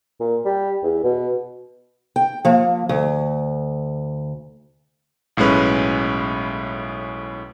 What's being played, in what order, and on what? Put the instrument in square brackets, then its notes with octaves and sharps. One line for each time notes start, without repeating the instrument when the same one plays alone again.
[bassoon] A#2
G3
E2
B2
[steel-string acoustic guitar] G5
F3 A#3
D2
[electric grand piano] B1 A2 G#3 C#4 B4